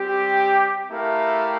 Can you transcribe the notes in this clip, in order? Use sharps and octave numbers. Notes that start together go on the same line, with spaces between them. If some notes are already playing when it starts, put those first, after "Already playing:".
Already playing: G3 C4 G4
A3 E4 G4 A#4 F5